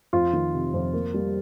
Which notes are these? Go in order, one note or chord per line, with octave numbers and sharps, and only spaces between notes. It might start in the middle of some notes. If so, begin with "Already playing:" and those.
F2 F4
D#3
C3
F2
A#3
G3